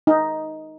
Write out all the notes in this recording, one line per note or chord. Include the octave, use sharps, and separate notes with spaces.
D#4